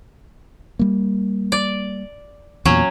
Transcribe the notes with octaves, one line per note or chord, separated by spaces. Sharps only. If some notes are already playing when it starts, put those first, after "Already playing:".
G3 A#3
D5
E2 A#2 F#3 C#4